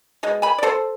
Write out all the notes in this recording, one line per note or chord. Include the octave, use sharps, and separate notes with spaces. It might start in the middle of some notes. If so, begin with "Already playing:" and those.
B2 G#3
G#5 B5
D5
A4 C5